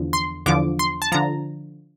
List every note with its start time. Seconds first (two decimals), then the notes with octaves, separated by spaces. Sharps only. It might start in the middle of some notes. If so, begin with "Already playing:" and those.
Already playing: E2 D3 F3
0.13 C6
0.46 E2 D3 F3 D6
0.79 C6
1.02 A5
1.12 D3 F3 A#5